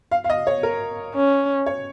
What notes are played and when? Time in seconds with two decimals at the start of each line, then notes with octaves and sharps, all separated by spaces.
0.12 F5
0.24 F5
0.30 D#5
0.47 C#5
0.63 A#4
1.15 C#4
1.66 C#5